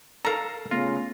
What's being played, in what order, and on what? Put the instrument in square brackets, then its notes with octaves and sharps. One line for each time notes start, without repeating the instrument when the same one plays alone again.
[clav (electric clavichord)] A4 F5 [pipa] A#4 A#5
[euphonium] C#3 [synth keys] A3 B3 A#6 [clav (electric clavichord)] F4